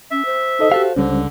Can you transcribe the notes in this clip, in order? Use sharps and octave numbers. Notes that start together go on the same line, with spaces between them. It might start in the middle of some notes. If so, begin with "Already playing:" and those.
C#4 E5
C5
D#4 A4 D#5
F#4 G4 A4 F5
C#2 D3 G3 C#4